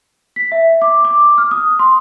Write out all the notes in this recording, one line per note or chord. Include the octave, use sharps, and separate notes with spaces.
B6
E5
D6
D6
F6
D#6
C6